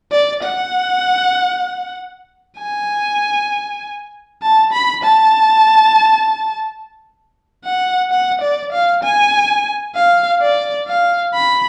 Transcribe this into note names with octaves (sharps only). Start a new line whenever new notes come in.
D5
F#5
G#5
A5
B5
A5
F#5
F#5
D5
F5
G#5
F5
D5
F5
B5